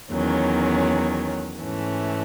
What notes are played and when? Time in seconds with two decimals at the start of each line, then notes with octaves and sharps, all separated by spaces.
0.12 E2 D#3 F#3 C#4
1.60 G#2 E3 A3 C#4